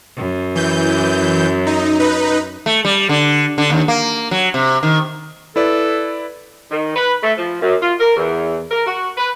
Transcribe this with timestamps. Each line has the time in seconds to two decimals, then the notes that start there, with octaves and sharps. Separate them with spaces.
0.17 F#2
0.55 E3 G6
1.67 D#4
1.99 D#4 B4
2.66 A3
2.85 G3
3.09 D3
3.58 D3
3.70 D#2
3.88 A#3
4.31 F#3
4.54 C3
4.83 D#3
5.56 E4 A4 B4 D5
6.71 D#3
6.96 B4
7.23 A3
7.38 F3
7.62 F#2
7.82 F4
8.00 A#4
8.16 E2
8.71 A#4
8.87 F#4
9.18 B4